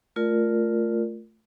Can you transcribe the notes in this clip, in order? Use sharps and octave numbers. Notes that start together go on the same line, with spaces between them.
A3 F4 A#4 D5